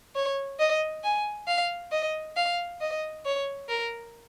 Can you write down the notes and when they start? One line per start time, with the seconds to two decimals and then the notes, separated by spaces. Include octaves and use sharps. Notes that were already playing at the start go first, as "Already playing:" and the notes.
0.15 C#5
0.59 D#5
1.04 G#5
1.48 F5
1.92 D#5
2.37 F5
2.81 D#5
3.25 C#5
3.69 A#4